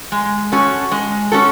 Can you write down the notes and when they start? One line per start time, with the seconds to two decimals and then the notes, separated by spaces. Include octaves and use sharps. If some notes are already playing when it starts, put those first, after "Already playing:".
0.12 G#3
0.52 C#4 F#4 A4
0.92 G#3
1.32 C#4 F#4 A4